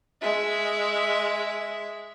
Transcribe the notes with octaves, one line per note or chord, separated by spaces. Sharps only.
G#3 E5